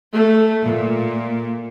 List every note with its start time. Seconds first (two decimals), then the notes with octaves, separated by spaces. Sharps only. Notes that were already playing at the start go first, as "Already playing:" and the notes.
0.11 A3
0.65 A#2